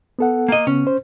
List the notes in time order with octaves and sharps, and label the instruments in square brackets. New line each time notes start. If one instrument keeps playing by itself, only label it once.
[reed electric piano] B3 A4 F#5
[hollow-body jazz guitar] A#3 D#5
[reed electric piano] C#3 B3 [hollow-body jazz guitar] C#4
[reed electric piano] C5